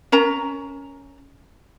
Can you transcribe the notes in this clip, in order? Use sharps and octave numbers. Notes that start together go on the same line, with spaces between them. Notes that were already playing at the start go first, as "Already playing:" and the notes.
C#4 A#4 A#5